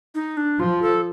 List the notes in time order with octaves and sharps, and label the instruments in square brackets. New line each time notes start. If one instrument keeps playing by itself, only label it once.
[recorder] D#4
D4
[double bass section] F3 [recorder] F4
[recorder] A4